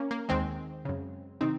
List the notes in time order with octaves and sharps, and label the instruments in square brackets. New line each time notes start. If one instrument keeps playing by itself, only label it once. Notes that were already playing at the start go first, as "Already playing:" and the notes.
Already playing: [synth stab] A#3 C#4
A#3
D#2 D#3 G#3 C4
F#2 C#3
C3 D#3 C4 D#4